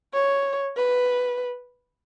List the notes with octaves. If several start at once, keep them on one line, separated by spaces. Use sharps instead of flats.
C#5
B4